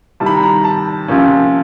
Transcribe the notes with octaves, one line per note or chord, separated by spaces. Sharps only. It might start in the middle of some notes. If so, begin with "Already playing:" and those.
C3 D#3 G3 A5
B5
A#5
A#5
A5
C3 F3 A#3 C#4